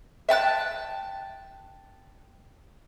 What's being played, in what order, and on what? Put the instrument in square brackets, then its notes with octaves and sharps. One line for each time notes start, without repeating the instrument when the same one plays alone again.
[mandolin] E5 G5 A5 F#6